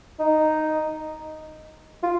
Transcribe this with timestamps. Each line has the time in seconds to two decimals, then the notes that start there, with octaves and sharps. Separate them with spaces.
0.19 D#4
2.03 F4